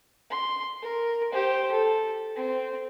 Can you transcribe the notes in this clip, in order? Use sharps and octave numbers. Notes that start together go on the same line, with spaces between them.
C6
A#4
G4 C5
A4
C4